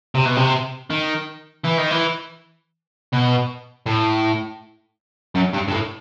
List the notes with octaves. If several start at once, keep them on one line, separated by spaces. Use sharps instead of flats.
C3
B2
C3
D#3
E3
D#3
E3
B2
A2
F#2
G2
G2
A2